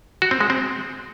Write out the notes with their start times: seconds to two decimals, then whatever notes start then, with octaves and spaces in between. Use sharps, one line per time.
0.22 F#4
0.31 C4
0.41 G#3
0.50 C4